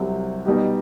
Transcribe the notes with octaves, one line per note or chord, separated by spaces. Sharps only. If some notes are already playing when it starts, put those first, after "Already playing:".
Already playing: C2 C3 F#3
B2 G3 D#4 G4